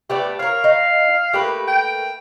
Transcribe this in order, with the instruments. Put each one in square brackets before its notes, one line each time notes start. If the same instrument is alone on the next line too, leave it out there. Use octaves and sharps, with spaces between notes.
[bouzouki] A3 B3 D5 [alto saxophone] G4
[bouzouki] A#4 C#5 [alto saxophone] F5
[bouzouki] D#4
[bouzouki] A3 A#3 B4 [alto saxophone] G4
[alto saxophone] G5